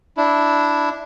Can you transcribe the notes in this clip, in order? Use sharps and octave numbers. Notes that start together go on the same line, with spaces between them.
D4 E4